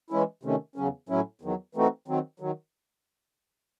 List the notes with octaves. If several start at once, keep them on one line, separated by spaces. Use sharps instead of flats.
E3 G#3 C#4 E4
C3 D#3 A3 C#4
E2 C#3 F#3 C#4
A2 F#3 C#4 E4
E2 D#3 F#3
E3 A3 C4 D#4 F#4
D#3 F#3 C4
D#3 F#3